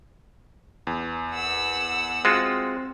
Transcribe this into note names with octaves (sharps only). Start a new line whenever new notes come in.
E2
F#5 E6
G#3 C4 F4 F#4